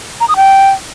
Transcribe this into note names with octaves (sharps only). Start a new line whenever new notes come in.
A#5
D#6
G5